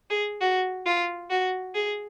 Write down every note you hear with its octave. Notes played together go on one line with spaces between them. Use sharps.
G#4
F#4
F4
F#4
G#4